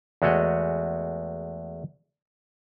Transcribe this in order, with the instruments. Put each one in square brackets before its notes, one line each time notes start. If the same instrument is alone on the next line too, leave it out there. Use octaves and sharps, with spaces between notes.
[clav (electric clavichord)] E2 G#3 A3 F#4 C#5 D#5